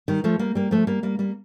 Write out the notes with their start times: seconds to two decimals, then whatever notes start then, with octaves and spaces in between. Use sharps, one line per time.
0.08 D#3 G3
0.24 F3 A3
0.39 G3 A#3
0.55 G3 A#3
0.71 F3 A3
0.87 G3 A#3
1.03 G3 A#3
1.19 G3 A#3